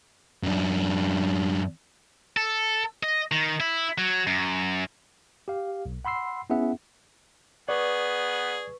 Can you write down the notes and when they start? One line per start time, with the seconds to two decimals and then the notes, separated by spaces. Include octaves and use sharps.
0.43 F#2 D4
2.37 A4
3.03 D#5
3.32 D#3
3.60 E4
3.98 F#3
4.27 F#2
5.48 G4 F5
5.86 B1
6.05 F#5 B5 C6 E6 C7
6.50 B3 C#4 E4 G#4 E5 F#5
7.69 B3 G#4 B4 D5 C#6